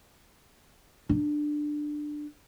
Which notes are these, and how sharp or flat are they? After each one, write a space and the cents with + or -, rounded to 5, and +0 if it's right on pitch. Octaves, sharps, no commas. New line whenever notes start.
D4 +15